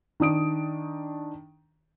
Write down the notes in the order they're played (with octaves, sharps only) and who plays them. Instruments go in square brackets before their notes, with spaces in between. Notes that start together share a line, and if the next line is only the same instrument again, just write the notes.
[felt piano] D#3 D4 D#6 D7